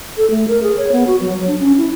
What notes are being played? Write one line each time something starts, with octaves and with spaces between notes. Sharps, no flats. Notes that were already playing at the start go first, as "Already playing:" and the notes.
A4
A3
A#4
G#4
C#5
B3
F#4
F#3
F#3
D4
C#4
E4